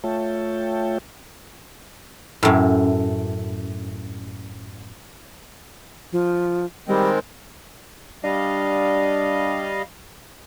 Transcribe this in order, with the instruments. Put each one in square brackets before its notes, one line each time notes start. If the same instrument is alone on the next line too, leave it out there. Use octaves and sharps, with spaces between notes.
[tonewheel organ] A3 F4 C#5 E5 G5 A5
[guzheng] F#2 A2
[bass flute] F3
[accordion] D#3 G#3 C4 [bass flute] G3
[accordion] G3 D#5 F5 [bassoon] D4